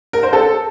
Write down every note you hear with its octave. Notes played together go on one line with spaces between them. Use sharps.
A#4
C5
A4